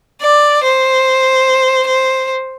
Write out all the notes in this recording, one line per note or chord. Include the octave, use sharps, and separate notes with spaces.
D5
C5
C5